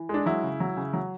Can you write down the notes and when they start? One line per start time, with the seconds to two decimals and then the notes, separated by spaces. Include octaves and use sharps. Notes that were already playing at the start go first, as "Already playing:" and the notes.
Already playing: E3
0.09 G#3 D4
0.26 F#3 E4
0.43 C#3
0.60 F#3
0.77 C#3
0.93 F#3